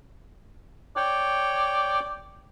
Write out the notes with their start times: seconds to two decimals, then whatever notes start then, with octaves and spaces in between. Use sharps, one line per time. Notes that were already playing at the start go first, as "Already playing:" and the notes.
0.97 C#5 D5 G5